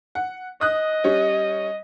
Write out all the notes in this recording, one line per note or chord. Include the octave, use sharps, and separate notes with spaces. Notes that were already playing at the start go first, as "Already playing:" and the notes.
F#5
D#5 D#6 F#6
G3 C#4